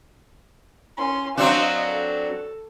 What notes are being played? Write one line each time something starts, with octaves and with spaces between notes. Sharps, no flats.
C#4 C6
F#3 C4 D4 D#5 F5
A4